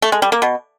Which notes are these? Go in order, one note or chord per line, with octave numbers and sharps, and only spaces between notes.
A3
G#3
G3
A#3
B2